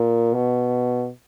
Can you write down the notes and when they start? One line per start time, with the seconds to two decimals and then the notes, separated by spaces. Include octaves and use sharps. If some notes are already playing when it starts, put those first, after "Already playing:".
Already playing: A#2
0.33 B2